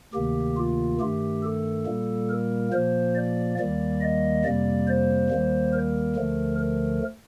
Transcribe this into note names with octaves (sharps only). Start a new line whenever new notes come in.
D2 C3 D#3 A#3 G4
F4
G2 D#3 A3 G4
A4
A#2 G3 A#3
A#4
A#2 F3 A#3 C5
D5
D#2 D#3 G3 A#3 D5
D#5
F2 C3 G3 A#3 D5
C5
D#2 D#3 G3 A#3
A#4
D2 D3 F3 A3
A#4